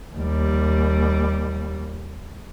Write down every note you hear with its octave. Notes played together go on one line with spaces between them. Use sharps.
D#2 G3